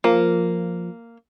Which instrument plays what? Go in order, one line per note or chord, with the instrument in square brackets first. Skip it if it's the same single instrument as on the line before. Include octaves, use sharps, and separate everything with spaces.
[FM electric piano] F3 [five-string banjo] A#3